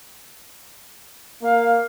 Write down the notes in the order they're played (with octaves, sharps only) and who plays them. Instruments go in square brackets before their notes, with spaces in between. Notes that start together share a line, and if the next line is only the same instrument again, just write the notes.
[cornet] A#3 [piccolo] F5